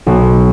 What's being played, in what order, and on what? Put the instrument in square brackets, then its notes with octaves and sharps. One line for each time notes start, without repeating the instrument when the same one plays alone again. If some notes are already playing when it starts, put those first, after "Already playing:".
[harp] B1